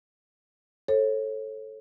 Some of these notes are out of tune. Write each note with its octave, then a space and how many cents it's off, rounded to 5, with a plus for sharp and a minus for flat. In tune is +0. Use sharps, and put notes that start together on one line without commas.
A4 +0 C#5 -35